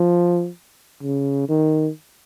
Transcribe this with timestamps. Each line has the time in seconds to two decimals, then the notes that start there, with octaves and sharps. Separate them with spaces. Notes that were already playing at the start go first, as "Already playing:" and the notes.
Already playing: F3
1.03 C#3
1.48 D#3